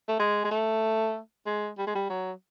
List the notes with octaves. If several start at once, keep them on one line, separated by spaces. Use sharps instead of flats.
A3
G#3
G#3
A3
G#3
G3
G#3
G3
F#3